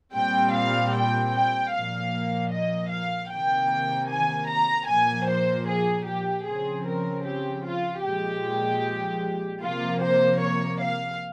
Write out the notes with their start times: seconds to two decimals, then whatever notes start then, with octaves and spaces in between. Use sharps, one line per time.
0.15 A#2 G3 C4 G5
0.55 F5
0.94 G5
1.34 G5
1.73 A#2 F3 A#3 F5
2.52 D#5
2.91 F5
3.30 C3 D#3 A#3 G5
4.10 G#5
4.49 A#5
4.88 A#2 F3 A#3 G#5
5.28 C5
5.68 G#4
6.07 G4
6.47 C#3 F3 C4 G#4
6.86 A#4
7.25 G4
7.65 F4
8.04 A#2 F3 G#3 G4
9.62 C3 F3 A#3 F4
10.02 C5
10.41 C#5
10.81 F5